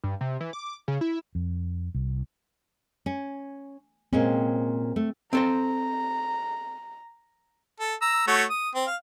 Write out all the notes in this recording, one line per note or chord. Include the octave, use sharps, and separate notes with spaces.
G2
C3
E3
D6
C#3
E4
F2
C2
C#4
A#2 G#3 C4 C#4
A3
C4 A4 C5 A#5
A4
A#5 E6
A3 F#4 C#5
D#6
C4
F5